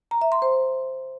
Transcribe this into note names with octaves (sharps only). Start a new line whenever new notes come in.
A#5
E5
C6
C5